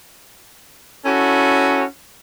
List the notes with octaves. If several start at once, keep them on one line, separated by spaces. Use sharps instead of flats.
C#4 E4 F#4 A4